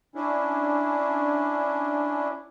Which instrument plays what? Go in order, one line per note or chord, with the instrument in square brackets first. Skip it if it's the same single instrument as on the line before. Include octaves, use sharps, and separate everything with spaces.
[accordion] C#4 D4 E4